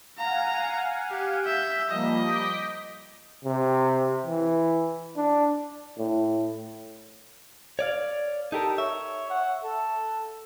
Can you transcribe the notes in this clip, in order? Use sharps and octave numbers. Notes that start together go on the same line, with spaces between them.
F5 F#5 G#5 A#5
G4
E5 G6
F3 G3 A#3 D#5
D6 G6 B6
C3
E3
D4
A2
C#5 D5 F5
D#4 G4 A4 A#4
C#5 E5
F#5
A4